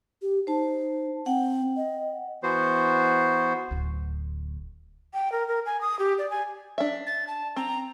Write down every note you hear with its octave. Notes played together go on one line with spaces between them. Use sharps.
G4
D#4 C5 A5
C4 F#5 G5
D#5
E3 B3 F#4 C5
D1 D2
G5
A#4
A#4
G#5
D#6
G4
D5
G#5
D4 E5
A6
A5
C4 A#5